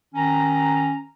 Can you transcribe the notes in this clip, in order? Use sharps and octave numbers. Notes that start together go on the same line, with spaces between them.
D#3 C#4 A#5